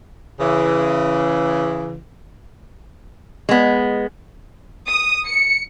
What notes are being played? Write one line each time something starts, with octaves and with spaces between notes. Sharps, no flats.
C#3 E3
G#3 B3
D#6
C#7